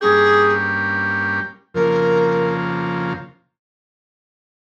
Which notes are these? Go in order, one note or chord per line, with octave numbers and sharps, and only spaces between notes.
G2 G3 A#3 C#4 G4 G#4
F2 C#3 F3 A#3 A#4